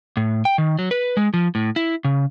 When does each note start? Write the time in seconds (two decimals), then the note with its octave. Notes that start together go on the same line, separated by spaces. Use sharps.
0.17 A2
0.45 G5
0.58 D#3
0.79 F#3
0.91 B4
1.17 G#3
1.34 F3
1.55 A2
1.76 E4
2.05 C#3